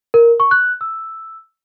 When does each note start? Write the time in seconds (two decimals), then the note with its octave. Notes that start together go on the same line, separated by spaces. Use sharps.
0.14 A#4
0.40 C#6
0.51 F#6
0.81 E6